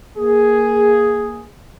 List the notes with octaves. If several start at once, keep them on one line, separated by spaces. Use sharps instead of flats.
A#3 G#4